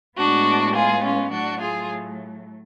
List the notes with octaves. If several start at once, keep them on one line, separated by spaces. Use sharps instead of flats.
A2 G#3 B3 D4 F#4
F4 G#4
C#4 F4
A2 F#3 A3 D4 F#4
F4 G#4